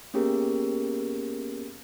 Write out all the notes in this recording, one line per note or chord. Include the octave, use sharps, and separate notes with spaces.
A#3 B3 C#4 G4 G#4 A#4